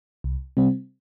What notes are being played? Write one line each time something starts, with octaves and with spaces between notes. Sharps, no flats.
C2
C3 G3 C4